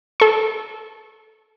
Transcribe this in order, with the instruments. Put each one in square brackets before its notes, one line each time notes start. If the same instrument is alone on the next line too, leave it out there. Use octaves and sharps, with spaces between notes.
[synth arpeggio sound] A4 C#6